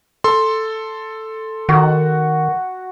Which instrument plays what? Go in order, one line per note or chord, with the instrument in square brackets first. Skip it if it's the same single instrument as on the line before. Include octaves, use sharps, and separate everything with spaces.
[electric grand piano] A4 C6
[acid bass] D#3 [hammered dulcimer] F#4